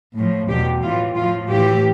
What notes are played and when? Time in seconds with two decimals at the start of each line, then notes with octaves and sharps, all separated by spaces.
0.16 A2 F3
0.50 E2 B2 G4
0.83 A2 E3 F4
1.16 A2 F3 F4
1.49 A2 E3 G4